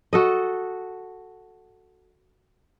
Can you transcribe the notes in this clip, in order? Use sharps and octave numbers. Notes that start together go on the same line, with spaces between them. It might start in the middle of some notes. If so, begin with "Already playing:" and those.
F#4 A4 D#5